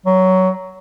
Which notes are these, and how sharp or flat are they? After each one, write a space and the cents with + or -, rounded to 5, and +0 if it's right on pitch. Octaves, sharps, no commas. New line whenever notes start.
F#3 +15